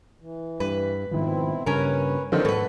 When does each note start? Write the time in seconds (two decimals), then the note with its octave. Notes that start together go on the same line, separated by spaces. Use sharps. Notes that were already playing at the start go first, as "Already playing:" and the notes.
0.20 E3
0.60 G2 B4
1.11 G#2 B2 D#3 F3 C4 E4
1.66 G2 C#3 C#4 A#4 B4 C#5
2.32 D3 D#3 F3 F#3 C4 D#4
2.45 G#2 B2 A4 B4